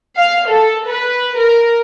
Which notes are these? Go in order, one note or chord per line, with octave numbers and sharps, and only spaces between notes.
F5
A4
B4
A#4